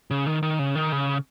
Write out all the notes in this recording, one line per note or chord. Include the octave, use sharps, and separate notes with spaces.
C#3
D#3
D#3
C#3
D#3
C#3